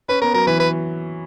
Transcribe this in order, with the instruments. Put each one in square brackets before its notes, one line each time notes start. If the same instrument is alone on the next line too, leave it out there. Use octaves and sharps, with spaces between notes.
[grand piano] C#4 [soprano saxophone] B4
[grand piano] B3 [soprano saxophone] A#4
[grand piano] F#3 [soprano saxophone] A#4
[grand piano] E3 [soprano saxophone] B4
[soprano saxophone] B4